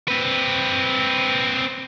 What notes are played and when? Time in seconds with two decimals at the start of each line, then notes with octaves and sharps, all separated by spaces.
0.08 C4 B4